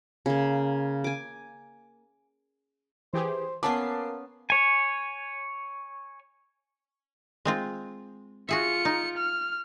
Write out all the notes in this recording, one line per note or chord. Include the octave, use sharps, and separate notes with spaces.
C#3 A#3
G#5 D6
E3 G4 G#4 C5
A#3 B3 C#4 B4 A5 D6 C7
C#5 G#5
G#3 C4 F4
F4 F#4 G#4 E5 C#7
D#4
F6